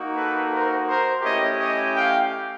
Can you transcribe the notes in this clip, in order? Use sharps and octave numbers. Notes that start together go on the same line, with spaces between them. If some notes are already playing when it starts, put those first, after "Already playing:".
Already playing: A#3 D#4 F#4
A4 B4
A#4 C5
A#4 C5
A3 C#4 E4 G4 C#5 D#5
C#5 D#5
F5 G5